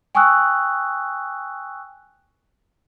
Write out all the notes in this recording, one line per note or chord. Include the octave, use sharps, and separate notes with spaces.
G5 G#5 C#6 D#6 E6 F#6